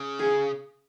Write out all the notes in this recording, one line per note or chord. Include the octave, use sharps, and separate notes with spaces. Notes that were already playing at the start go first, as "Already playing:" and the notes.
Already playing: C#3
G#4